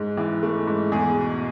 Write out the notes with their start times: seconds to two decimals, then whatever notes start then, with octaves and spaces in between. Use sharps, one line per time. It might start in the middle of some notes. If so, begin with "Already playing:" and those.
Already playing: G#2
0.17 E3
0.43 A3
0.67 G#2
0.92 E2 G#4
1.16 B2